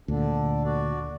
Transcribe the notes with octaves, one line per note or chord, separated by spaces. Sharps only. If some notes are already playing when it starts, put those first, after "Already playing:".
D2 A#2 D3 D4
F#4 D5